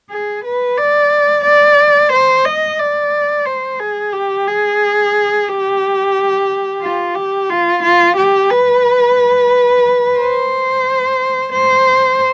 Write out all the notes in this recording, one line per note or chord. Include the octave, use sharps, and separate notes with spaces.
G#4
B4
D5
D5
C5
D#5
D5
C5
G#4
G4
G#4
G4
F4
G4
F4
F4
G4
B4
C5
C5